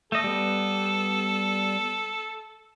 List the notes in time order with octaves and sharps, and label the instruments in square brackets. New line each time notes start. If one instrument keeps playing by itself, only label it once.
[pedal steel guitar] A3 D#5 [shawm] A4
[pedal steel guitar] G3 B3